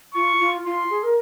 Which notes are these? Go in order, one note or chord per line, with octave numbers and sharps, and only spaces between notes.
F4 C#6
F4
F4 C6
G#4
A#4